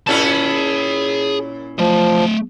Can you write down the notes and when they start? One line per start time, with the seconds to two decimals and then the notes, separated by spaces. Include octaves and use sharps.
0.07 A#2 C#4 E4 G#4 A5
1.79 F3 A3 D#5